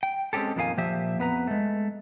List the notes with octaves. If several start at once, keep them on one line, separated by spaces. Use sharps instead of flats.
G5
G#3 C4 C#4 G4 A4
F2 A#2 D#3 D4 F5 G#5
A#2 F3 G4 E5
F2 B3 B4 A#5
G#3 A3